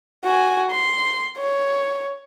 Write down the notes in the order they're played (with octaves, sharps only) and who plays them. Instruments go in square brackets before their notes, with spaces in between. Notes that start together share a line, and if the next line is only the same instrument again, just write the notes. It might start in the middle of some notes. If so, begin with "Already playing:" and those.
[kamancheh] F#4 G#5
C6
C#5